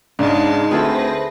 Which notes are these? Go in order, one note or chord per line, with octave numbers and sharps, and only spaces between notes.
G#2 C#3 G#3 D4 D#4 A5
D2 C4 G#4 A4 B4 C5 E5 A#6